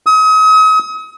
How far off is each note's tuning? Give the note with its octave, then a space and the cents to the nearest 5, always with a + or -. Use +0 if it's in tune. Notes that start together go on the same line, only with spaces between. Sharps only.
D#6 +40